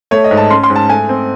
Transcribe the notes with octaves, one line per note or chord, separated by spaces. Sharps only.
A3 C#5
D#5
G#2
A5
C#4 C6
C6
G#2
A5
A3 G#5
C4